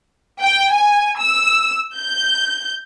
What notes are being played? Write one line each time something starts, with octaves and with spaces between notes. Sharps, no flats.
G5
G#5
E6
G6